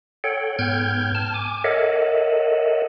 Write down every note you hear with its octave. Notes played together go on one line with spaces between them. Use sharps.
A4 C#5 F#5 G5
G#2 B3 G5 F6 G6 G#6
A5 F6
G#5 D6
A4 A#4 C#5 D#5 E5 F#5